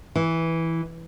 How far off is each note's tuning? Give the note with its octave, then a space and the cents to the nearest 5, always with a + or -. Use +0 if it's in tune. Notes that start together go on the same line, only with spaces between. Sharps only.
E3 -5